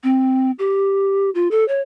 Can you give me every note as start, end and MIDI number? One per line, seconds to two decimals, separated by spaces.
0.04 0.51 60
0.59 1.30 67
1.35 1.48 65
1.51 1.66 69
1.68 1.81 73